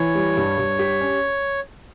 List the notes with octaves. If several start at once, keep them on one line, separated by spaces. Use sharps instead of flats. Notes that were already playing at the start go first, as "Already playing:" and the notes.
Already playing: E3 C#5
G3
G2
G2
G4
C#4